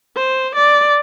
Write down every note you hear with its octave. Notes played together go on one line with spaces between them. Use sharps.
C5
D5